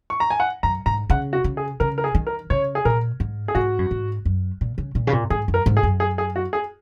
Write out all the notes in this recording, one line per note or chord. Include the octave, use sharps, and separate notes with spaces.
C#6
A#5
G#5
F#5
F#2 A#5
G#2 A#5
C#3 F#5
F#4
C#3
G#4
C#3 A#4
A#4
G#4
D#3
A#4
C#3 C#5
G#4
A#2 A#4
G#2
G#4
G#2 F#4
F#2
G#2
F#2
A#2
C#3
A#2
C#3
A#2
G#2 G#4
F#2
A#4
G#2
G#4
F#2
G#4
G#4
F#4
G#4